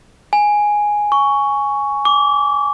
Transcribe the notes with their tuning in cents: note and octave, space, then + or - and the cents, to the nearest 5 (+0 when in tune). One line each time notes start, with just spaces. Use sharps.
G#5 +0
C#6 +10
D6 -25